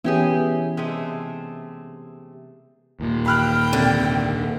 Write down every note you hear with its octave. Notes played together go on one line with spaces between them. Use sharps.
E3 B3 C#4 E4 G4 G#4
C3 G#3 A3
D#2 A#2
G5 B5 F6 F#6
C2 D3